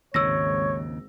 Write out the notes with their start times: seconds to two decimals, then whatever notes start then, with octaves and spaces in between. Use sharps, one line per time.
0.14 G#1 D#2 C#3 C#5 E6 A#6